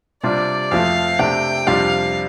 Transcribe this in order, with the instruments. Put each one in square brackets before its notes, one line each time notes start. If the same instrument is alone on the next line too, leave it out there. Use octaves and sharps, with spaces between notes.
[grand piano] C3 G3 D4 F4 [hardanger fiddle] D5
[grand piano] F2 F3 A3 [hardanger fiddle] F5
[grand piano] C3 A3 D4 [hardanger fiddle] G5
[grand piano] F2 C3 G3 D4 F4 [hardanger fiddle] F5